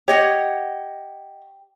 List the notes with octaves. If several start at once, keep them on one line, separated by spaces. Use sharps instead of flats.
G4 C#5 D#5 F#5